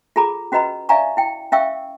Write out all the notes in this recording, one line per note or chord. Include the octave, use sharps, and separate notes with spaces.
F4 G#4 A4 A#5 B5 D6
C#4 F#4 B4 D#5 A#5 B5
D5 E5 F5 G#5 A#5 C#6
E4 G5
C#4 E5 F5 G5 C#6 E6